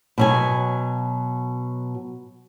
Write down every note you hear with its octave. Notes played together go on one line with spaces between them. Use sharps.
B2 F#3 G#5